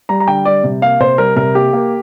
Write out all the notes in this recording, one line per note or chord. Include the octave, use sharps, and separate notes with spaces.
G3 A#5
A#5
D3 G5
G3 D5
C3
A#3 F5
C3 C5
G3 A#4
C3 A#4
A#3 G4
A#3